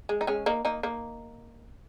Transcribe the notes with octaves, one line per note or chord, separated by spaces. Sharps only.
G#3
D#4
G#3 C#4
A#3 D#4
A#3 D#4
A#3 D#4